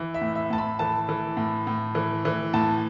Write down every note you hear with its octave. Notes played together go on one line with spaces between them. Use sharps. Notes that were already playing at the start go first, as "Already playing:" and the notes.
Already playing: E3
E5
A2
E5
A2 A5
B5
E3 A5
E3
A2
A2
E3
E3
A2 A5